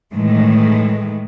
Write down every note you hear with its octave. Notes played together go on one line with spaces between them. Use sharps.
A2 D#3 E3 G#3 A3